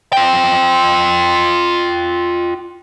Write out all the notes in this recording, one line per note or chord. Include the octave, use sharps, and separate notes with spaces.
F4 G5